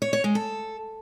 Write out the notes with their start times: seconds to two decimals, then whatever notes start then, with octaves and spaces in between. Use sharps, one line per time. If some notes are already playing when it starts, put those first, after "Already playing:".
0.02 C#5
0.13 C#5
0.24 G#3
0.35 A4